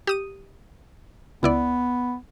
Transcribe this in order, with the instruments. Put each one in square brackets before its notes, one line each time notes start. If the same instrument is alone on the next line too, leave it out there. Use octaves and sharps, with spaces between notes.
[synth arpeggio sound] G4 D#6 D#7
[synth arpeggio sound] C#2 E4 D5 [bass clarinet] B3